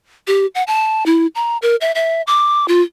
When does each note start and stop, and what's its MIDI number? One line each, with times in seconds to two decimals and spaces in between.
0.28 0.46 67
0.55 0.63 78
0.67 1.04 81
1.06 1.27 64
1.35 1.57 82
1.62 1.76 70
1.81 1.92 76
1.95 2.22 76
2.27 2.68 86
2.68 2.82 65